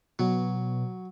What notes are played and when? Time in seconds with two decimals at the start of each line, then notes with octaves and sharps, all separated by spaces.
0.19 B2 F#3